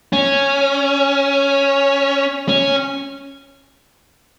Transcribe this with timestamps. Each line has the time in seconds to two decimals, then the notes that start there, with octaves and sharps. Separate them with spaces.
0.13 C#4
2.48 C#4